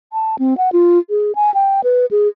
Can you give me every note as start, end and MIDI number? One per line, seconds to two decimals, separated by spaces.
0.13 0.36 81
0.39 0.57 60
0.58 0.72 78
0.73 0.99 65
1.10 1.35 68
1.35 1.53 80
1.54 1.81 79
1.84 2.06 71
2.11 2.28 68